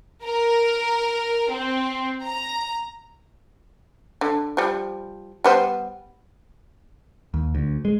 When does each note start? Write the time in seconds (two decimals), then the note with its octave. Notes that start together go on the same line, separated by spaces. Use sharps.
0.22 A#4
1.50 C4
2.22 A#5
4.21 D3
4.57 F3 G3
5.44 G3 B3 C5
7.34 D#2
7.55 D2
7.85 G#3